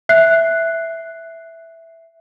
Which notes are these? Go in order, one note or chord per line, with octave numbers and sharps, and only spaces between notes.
E5 F#6 C7